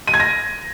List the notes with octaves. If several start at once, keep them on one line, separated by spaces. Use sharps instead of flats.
D#7
G#6
A#6